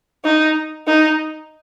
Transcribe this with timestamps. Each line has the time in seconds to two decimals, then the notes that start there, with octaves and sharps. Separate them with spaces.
0.25 D#4
0.87 D#4